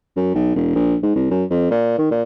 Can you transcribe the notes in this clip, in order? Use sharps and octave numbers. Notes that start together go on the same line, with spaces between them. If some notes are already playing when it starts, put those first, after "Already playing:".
F#2
B1
E1
A#1
G#2
C2
F#2
F2
A#2
D#3
A#2